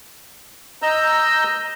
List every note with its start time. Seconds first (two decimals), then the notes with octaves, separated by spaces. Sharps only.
0.82 D#5 A#5 E6 G6